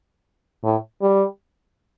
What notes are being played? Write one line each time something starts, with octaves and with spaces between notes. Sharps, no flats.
A2
G3